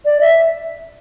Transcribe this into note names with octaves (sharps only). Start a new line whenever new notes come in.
D5
E5